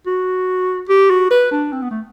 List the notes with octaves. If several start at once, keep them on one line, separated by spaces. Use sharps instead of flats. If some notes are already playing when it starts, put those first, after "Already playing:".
F#4
G4
F#4
B4
D4
C4
B3
A3